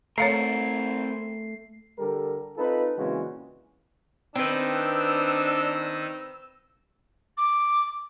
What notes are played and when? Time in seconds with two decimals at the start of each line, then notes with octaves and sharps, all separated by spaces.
0.18 A3 C4 A#4 C#5 F5 A#5 C7
1.98 D3 G3 A4 A#4
2.57 C4 D#4 F4 A4 B4
2.97 A#2 C#3 E3 G#3 C4 F#4
4.35 D#3 C4 D4 D#4 B4 E6
7.38 D6